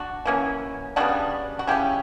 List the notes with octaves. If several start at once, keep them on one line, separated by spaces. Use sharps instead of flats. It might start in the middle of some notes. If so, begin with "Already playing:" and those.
Already playing: D4 F#4
E3 A#3 C#4
C#3 G3 B3 D4 F#4
F#4
C#3 F#3 C#4 E4 G4